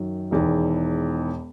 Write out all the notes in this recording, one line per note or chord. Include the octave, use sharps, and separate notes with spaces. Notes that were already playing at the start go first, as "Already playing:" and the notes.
Already playing: F#2 D#3 F#3
E1 E2 D#3